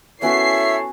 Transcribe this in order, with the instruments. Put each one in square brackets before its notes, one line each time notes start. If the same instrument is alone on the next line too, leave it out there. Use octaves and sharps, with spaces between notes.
[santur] B3 C#4 F#4 [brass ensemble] E4 A4 C#5 [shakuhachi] E5 [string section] C7